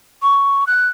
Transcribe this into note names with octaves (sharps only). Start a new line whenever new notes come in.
C#6
F#6